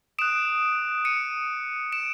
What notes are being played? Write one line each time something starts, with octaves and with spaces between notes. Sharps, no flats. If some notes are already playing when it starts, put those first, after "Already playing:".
D#6 F#6 D7 E7
C#7 D#7
D7 E7